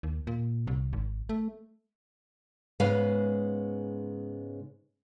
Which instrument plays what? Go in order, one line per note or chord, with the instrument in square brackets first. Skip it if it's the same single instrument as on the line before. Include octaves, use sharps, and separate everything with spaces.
[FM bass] D#2
A#2
C2
G#1
A3
[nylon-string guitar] G#2 C#3 G#3 B3 B4 F5